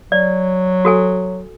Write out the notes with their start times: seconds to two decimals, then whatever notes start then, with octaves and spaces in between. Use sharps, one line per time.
0.12 F#3 D5
0.85 F#4 A4 G#5